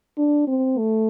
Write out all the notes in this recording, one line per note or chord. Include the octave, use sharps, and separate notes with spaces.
D4
C4
A3